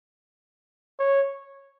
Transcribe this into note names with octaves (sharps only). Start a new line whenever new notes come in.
C#5